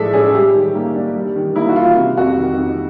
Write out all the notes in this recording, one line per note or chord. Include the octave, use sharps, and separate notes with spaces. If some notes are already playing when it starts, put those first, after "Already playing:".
Already playing: A2 F3 G#3 A4 D5 E5
C#4 G#4
G3 G4
D#3
A#3
D4
G3
D#3
A#3 E4
F#4
D#3 F4
C3
F2 F#4
D#3
F2